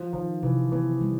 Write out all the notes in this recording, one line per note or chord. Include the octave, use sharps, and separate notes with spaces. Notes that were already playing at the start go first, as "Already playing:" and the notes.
Already playing: F3
D#3 F3
C3 E3
E3 B3
G3